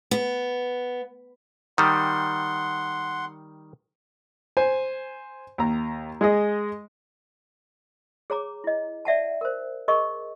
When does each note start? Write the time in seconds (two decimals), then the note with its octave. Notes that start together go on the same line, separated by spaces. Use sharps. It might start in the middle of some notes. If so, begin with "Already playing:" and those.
0.11 B3
1.78 D#3 G3 F#5 C6
4.57 C5 G#5
5.58 D#2 A#5
6.21 G#3 G#4 D#5
8.30 G#4 C#5 A#5 D6
8.64 E4 D#5
9.05 D5 E5 F#5 A5
9.41 A#4 C5
9.88 G#4 A#4 D#5 C#6